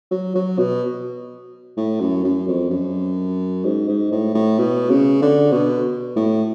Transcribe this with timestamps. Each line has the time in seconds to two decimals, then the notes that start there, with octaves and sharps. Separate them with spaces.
0.11 F#3
0.35 F#3
0.58 B2
1.77 A2
2.00 F#2
2.24 F#2
2.47 F2
2.70 F#2
3.64 G#2
3.88 G#2
4.12 A2
4.34 A2
4.59 B2
4.90 C#3
5.22 D3
5.52 B2
6.16 A2